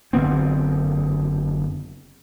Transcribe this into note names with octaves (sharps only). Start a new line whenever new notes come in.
F#1 D3 B3 C4